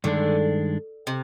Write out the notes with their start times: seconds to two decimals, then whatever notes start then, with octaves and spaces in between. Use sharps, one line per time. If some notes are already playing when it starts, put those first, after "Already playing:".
0.04 G2 D3 D#3 G#3 D4
1.07 C3